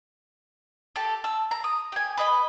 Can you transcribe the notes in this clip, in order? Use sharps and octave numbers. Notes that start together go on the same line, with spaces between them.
G4 A4 A5
A5 E6
A#5
D#6
G4 G#5
B4 D#5 B5